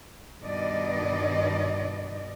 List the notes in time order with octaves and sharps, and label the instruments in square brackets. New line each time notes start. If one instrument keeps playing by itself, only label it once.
[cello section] G2 B2 D#3 D5 D#5